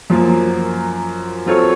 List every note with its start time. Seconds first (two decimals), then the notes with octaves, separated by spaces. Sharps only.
0.10 F#2 F3 A#3 F4
1.46 F#3 C4 F4 A4 C#5